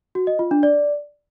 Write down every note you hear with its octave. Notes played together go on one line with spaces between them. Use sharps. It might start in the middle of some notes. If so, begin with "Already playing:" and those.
F#4
D#5
F4
D4
D5